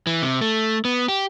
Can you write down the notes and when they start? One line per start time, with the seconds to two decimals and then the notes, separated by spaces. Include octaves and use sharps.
0.07 E3
0.22 C3
0.41 A3
0.85 B3
1.08 G4